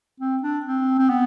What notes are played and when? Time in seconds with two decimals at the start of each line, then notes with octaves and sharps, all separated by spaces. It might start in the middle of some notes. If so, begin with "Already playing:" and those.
0.20 C4
0.43 D4
0.66 C4
0.98 C4
1.10 B3